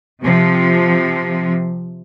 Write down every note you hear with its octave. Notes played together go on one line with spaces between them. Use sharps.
C3 F3